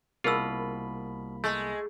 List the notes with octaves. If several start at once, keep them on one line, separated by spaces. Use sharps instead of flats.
C2 B2 A#3 F4 G#4 A#4 B5 E6
G#3 A3